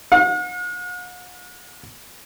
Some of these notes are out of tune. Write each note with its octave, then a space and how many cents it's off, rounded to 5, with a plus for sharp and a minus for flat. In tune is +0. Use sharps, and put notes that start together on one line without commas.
F#5 -45